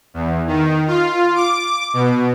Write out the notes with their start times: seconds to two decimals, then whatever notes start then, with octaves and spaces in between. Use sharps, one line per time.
0.14 E2
0.47 D#3
0.87 F4
1.35 D6
1.93 B2